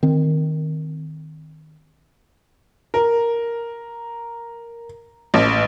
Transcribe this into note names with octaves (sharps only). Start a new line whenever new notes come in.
D#3 C4
A#4
A1